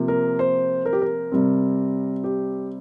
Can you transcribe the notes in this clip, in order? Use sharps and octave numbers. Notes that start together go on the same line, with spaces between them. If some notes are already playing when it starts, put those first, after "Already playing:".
Already playing: C3 F3 A#3
A#4
C5
A#4
G4
A#4
C3 G3 C4
G4